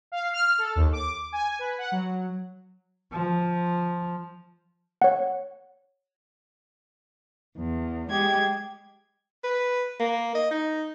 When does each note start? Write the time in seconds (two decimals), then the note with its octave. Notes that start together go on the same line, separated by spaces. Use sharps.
0.12 F5
0.33 F6
0.58 A4
0.76 D#2
0.93 D6
1.32 G#5
1.59 B4
1.78 F#5
1.92 F#3
3.12 F3
5.02 C#5 F#5
7.56 E2
8.09 G#3 G4 G#6
9.44 B4
10.00 A#3
10.35 D#5
10.51 D#4